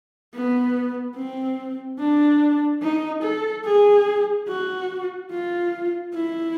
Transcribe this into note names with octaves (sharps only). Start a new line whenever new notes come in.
B3
C4
D4
D#4
A4
G#4
F#4
F4
E4